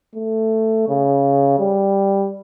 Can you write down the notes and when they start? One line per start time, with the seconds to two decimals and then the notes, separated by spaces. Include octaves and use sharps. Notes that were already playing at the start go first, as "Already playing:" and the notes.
0.16 A3
0.89 C#3
1.60 G3